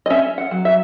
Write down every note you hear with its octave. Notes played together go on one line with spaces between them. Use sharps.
D#5
C#4 E5
F#5
F#3
E5